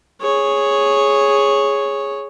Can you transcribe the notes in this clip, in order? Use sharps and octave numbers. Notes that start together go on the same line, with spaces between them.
G#4 C#5